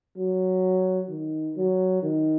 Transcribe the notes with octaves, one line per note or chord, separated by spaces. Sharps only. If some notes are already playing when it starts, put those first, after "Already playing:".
F#3
D#3
F#3
D#3